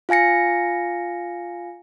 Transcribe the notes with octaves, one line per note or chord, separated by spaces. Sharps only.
F4 F5 G#5 A#6 C#7